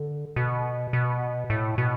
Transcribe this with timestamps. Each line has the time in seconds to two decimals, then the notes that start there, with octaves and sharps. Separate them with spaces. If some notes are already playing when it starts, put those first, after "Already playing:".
Already playing: D3
0.36 B2
0.93 B2
1.50 A2
1.78 B2